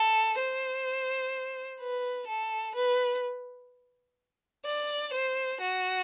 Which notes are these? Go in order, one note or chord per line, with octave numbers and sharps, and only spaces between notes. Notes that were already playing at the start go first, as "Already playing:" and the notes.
Already playing: A4
C5
B4
A4
B4
D5
C5
F#4